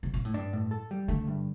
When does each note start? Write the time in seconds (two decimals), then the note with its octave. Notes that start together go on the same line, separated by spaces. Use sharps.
0.03 C3
0.14 A#2
0.25 A2
0.34 G2 D4
0.53 A2
0.71 A4
0.91 G3
1.08 D3 A3
1.27 G2